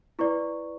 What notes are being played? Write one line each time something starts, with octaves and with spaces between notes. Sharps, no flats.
E4 B4 D5 C#6